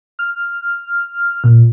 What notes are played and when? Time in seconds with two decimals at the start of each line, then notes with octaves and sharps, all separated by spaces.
0.19 F6
1.44 A#2